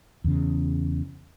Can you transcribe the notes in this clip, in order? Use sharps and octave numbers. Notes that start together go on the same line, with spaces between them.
E2 C#3